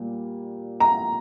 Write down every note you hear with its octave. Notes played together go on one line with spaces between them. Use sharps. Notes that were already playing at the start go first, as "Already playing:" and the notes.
Already playing: A#2 G3 A#3
A#5